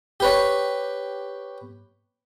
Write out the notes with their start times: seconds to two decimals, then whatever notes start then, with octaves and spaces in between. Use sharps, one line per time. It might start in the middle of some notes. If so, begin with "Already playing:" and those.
0.20 G4 B4 C#5